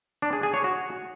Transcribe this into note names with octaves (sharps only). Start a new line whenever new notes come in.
D4
G#4
G#4
C#5
F#4